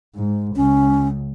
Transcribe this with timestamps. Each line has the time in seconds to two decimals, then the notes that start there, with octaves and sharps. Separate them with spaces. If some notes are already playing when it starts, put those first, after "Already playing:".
0.15 G#2
0.56 C#2 C#4